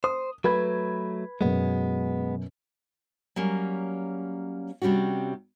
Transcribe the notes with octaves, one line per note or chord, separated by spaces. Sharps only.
C5 D#6
F#3 A3 B4 B5 G#6
F#2 B2 G#3 B3
F#3 G3 A#3 C#4
C3 G3 C#4 D4 F#4